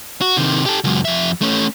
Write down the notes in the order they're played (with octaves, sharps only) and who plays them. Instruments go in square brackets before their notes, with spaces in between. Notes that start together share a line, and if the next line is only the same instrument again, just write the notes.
[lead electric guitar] F#4
C3 D#3
G4 A4
C#2 F#2
F2 E5
A3 C#4